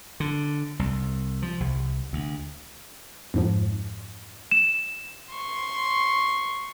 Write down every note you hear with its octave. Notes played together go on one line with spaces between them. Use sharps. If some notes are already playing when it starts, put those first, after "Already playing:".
D3
C2
F3
C2
D2
F2 G#2 F3
E7
C6 C#6